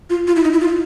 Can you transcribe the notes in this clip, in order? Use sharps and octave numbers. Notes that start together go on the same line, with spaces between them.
F4
F4
E4
D#4
E4
F4